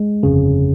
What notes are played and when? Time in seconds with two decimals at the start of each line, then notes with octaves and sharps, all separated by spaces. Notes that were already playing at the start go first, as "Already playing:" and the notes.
Already playing: G#3
0.23 G1 F2 C#3